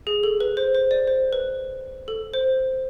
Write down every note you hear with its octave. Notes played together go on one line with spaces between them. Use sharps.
G#4
A4
B4
C5
C5
D5
C5
B4
A4
C5